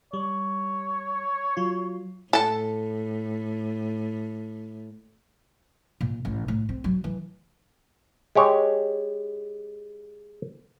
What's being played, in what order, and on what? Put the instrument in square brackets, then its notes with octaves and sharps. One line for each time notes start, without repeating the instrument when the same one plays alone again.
[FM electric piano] G3 [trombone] C#5
[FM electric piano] F#3 F4
[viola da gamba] A2 [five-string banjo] A4 A5
[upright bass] A#2
A1
A2
C4
F#3
E3
[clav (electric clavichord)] G#3 G4 C#5